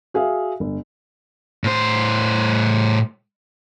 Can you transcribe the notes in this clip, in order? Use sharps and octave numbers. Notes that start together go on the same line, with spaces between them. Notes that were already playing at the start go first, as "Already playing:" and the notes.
F#4 G#4 E5 F5
G1
A2 C5